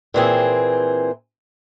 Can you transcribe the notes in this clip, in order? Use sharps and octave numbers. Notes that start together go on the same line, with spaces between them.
A#2 E3 C4 G#4